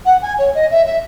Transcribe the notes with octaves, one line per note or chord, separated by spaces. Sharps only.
F#5
G#5
C#5
D#5
E5
E5